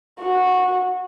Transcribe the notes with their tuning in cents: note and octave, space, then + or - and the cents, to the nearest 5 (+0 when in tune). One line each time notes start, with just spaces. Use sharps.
F#4 -15